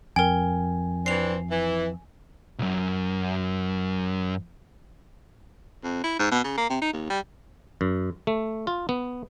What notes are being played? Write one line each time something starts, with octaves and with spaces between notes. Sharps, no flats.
F2 A#4 G5 G#5
E3 C4 D4 C7 F7
E3
B1 F#2
F2
E4
G#2
B2
C#3
A#3
C3
D#4
D#2
G3
F#2
A3
F4
B3